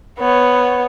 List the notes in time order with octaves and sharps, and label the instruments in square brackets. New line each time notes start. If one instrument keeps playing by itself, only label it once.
[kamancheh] B3 C#5